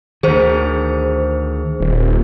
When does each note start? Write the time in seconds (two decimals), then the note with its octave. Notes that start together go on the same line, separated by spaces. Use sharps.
0.23 D2 D#3 G#4 C5
1.80 D#1